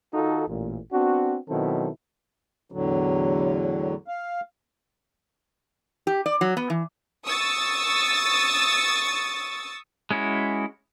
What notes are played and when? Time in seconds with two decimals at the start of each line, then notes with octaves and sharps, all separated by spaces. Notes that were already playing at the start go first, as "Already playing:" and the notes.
0.14 D#3 D#4 F4 F#4 A4
0.48 A1 A#2
0.92 B3 C4 D4 F#4
1.49 B2 D#3 F#3 C4 E4 A4
2.72 E2 A2 D3 F#3
4.08 F5
6.07 G4
6.26 D5
6.41 F#3
6.57 B3
6.70 E3
7.26 C#6 D#6 E6 A6
10.11 G#3 C#4 E4 F#4